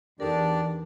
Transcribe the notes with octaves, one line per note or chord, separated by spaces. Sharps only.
E2 D4 D#4 G4 A4 A#4 D5